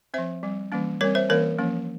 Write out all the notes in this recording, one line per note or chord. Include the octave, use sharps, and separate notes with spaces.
F3 C4 C5 E5
G3 C4
E3 G3 A#3 C#4
G3 C4 A#4 C#5
C5 E5
E3 A#3 C#4 A#4 C#5
F3 A#3 C#4